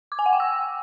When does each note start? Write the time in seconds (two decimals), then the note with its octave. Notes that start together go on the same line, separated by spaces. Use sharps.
0.12 D6
0.19 G#5
0.26 F#5
0.33 G5
0.40 E6